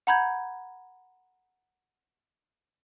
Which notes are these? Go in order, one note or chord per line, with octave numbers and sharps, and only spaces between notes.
F#5 A#5 B5 G6 G#6